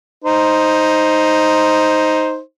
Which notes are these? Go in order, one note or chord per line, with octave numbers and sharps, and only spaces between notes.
D#4 C5